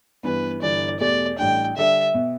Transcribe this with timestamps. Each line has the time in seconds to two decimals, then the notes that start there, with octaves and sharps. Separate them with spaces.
0.23 G2 E3 B3 B4
0.62 G1 G2 E3 D5
1.00 E2 B2 A3 G4 D5
1.38 A1 A2 G3 D4 G5
1.76 D3 G3 D4 A4 D5 E5
2.14 B2 B3